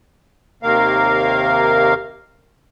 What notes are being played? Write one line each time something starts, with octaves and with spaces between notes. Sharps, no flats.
D#2 C3 D#3 A#3 A#4 F5